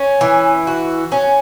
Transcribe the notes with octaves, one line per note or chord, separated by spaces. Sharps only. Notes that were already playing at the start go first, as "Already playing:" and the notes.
Already playing: C#4
E3
F#4
C#4